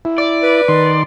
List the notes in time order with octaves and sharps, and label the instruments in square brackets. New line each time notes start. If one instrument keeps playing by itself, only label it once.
[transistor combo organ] E4
[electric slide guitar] D5
[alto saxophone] B4
[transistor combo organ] D#3 C6